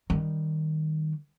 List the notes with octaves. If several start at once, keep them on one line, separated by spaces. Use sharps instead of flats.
D#3 G3